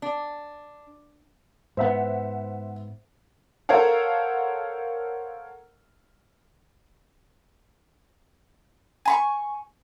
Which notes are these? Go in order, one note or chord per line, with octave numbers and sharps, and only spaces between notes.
D4
G#2 B3 C5 E5 F#5
A4 A#4 C5 C#5 F5 F#5
G#5 B5 C#6